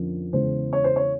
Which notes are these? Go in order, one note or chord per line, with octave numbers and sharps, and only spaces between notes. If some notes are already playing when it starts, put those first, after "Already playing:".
Already playing: F2 D3 F3 A#3 C#4
E2 C#3 E3 G#3 C5
C#5
C5
C#5